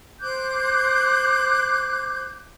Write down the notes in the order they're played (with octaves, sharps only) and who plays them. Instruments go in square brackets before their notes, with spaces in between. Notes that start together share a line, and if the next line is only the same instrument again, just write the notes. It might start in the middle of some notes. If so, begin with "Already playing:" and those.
[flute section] C5 D6 F#6 G6